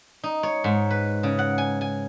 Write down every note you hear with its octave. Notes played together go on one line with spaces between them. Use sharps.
D#4
C#5
G#2
B4
C#3
F#5
G#5
G#5